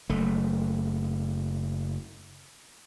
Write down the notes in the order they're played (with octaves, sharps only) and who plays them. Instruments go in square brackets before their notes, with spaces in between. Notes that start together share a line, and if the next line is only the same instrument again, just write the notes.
[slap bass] F#1 A3